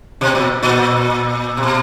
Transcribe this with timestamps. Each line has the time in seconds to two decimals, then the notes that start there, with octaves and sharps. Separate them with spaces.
0.21 B2
0.35 A#2
0.63 A#2
1.57 C3
1.63 B2